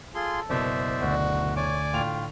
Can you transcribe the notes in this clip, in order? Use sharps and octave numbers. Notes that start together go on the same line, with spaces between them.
F4 G#4 A4 C6
F#1 B2 C5 D5 E5
D2 F#4
C#5 D5 G#5 D6
A2 F4 G5 F7